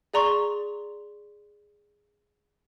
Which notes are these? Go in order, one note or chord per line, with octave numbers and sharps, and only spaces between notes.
G#4 D5 A#5 C6 C#6